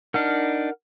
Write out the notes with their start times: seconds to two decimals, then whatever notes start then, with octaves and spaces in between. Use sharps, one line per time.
0.14 D4 D#4 A#4 F#5 F6